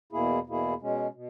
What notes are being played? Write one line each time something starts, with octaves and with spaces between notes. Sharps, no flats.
E2 B2 A#3 E4 G#4
E2 B2 A#3 E4 G#4
B2 G#3 C#4
B2